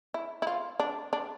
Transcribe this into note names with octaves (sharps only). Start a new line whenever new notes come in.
E4
E4
F4
D4
D4